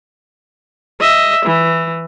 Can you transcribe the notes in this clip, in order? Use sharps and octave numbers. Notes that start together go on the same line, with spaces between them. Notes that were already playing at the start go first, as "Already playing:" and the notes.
D#5 E5
E3